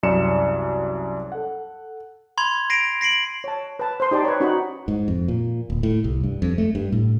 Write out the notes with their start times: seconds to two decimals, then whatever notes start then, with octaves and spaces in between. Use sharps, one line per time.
0.03 C2 F#2 D5 C#7 E7
1.32 A4 F#5
2.38 B5 C6 G#6 F7
2.70 A#6 C7 D7 D#7 F7
3.01 A#6 C7 D7 F#7
3.44 C#5 A5
3.79 B4 A5
4.00 C5 C6
4.11 D#4 G4 D5 G5 A5
4.24 B4 C#5
4.40 C#4 D#4 F#4 F#5 B5
4.88 G#2
5.08 F2
5.28 A#2
5.70 D1
5.83 A2
6.04 C2
6.23 G2
6.42 F2
6.58 A3
6.75 G2
6.92 A2